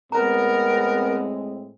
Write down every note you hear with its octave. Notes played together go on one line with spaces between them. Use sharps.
A2 G#3 B3 C4 A#4 A#5